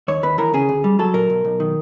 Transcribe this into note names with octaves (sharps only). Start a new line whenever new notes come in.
D#2 C#5
D#2 B4
E3 A#4
C#3 G#4
D2
G3
F#3 A4
A#2 A#4
B1
B1
D#3